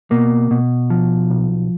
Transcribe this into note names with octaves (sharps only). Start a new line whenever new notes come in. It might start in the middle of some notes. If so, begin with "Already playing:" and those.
B2 A#3
B2
F3
B1